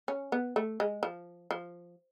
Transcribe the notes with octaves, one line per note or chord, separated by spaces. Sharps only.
C#4
B3
A3
G#3
F3
F3